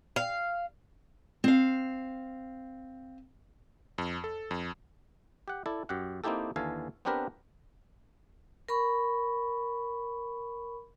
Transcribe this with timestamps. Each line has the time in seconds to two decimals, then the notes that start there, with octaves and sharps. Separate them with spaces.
0.16 F5
1.44 C4 F5
3.98 F2
4.24 A4
4.51 F2
5.48 G4 F#5
5.66 E4 A4 D5
5.89 F#2 G4 F#5
6.24 A#3 C4 D#4 E4 G4 A4
6.56 D#2 D3 E3 A4 F5 G#5
7.05 B3 C4 D4 G4 A#4 B4
8.69 A#4 B5 C#6